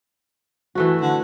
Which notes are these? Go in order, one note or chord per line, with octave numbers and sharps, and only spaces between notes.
E3 A3 F#4
D3